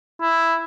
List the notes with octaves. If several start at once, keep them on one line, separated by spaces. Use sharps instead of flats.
E4